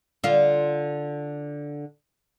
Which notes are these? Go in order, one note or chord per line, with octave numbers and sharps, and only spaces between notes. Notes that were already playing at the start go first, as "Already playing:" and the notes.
D3 F4